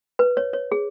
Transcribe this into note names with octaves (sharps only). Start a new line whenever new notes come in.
B4
C#5
C#5
G#4